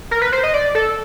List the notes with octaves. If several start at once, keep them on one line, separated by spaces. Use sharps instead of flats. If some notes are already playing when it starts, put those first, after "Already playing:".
A#4
B4
C5
D#5
D5
A4